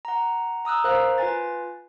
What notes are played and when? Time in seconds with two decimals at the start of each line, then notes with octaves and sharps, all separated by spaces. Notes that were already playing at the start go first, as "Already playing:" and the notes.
0.05 F#5 A#5
0.65 A#5 D#6 E6 F#6
0.84 A#4 C5 F5 A#5 F#6
1.18 F4 B4 G#5 A6